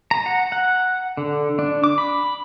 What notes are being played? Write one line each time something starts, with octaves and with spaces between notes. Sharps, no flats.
A#5
F#5
F#5
D3
D4
D6
B5